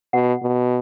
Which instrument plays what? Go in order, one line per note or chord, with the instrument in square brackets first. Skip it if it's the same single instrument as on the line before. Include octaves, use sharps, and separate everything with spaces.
[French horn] B2 [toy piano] F#5
[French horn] B2